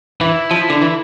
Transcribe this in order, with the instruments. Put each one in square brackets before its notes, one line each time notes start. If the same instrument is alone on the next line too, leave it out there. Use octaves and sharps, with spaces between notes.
[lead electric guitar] E3 [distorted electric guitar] E4
[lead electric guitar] F3
D3
E3